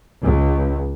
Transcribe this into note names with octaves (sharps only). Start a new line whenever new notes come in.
C#2